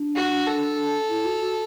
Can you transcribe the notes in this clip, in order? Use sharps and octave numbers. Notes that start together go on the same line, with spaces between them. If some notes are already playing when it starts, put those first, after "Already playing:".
Already playing: D4
F#4
A4
E4
F#4
F#4